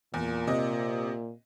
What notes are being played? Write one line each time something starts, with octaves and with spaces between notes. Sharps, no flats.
E2 A#2
C3 D#5